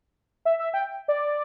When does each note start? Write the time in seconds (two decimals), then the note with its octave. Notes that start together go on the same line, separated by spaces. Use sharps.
0.45 E5
0.59 E5
0.74 G5
1.08 D5